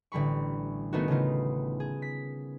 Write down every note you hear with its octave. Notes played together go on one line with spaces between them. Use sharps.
A1 D3 G3 B5 C#6
D#3 A3 B3 D#4 F#4
C#3 A3 D#4 F4
G#4
B6